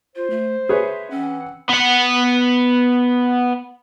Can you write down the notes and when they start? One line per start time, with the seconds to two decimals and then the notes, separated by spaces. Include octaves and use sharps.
0.16 F4 C5
0.30 A3
0.69 G#4 B4 C#5 E5
1.11 E3 C4 C#4 F#5
1.70 B3 F#5